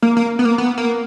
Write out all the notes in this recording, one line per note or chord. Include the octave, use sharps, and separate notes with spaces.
A#3
A#3
B3
A#3
B3
A#3